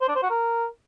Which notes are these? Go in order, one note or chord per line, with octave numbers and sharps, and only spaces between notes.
C5
D4
C5
F#4
A#4